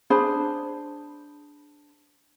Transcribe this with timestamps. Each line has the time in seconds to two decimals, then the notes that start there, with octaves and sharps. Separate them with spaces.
0.10 D4 G#4 C5 B5